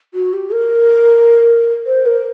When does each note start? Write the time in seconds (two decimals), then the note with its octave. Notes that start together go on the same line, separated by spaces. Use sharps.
0.14 F#4
0.33 G4
0.52 A#4
1.86 C5
2.05 A#4